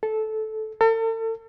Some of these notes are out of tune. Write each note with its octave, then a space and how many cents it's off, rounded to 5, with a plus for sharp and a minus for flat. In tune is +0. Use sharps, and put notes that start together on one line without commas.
A4 -15
A4 +40